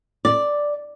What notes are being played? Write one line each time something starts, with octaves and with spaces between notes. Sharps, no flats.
D5